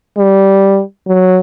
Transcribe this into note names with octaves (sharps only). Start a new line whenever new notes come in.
G3
F#3